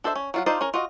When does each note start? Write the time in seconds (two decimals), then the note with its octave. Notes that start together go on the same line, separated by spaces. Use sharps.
0.04 D4 A4 C5 D#5 E5
0.15 C#4
0.34 F#3 F4 F#5
0.46 D#4 F4 A4 C5 D5
0.61 C#4 A#4
0.74 F4 F#4 D#5